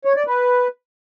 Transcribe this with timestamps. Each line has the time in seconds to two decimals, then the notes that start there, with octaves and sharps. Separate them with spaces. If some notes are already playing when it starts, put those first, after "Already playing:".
0.05 C#5
0.16 D5
0.27 B4